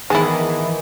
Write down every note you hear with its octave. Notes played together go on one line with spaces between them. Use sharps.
D#3 E3 G#3 B3 E4 G#4 F#5 A5